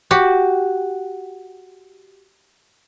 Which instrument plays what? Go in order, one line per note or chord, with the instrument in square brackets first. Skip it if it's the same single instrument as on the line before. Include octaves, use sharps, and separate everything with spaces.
[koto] F#4 G4